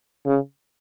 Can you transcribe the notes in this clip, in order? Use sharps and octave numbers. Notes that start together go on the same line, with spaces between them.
C#3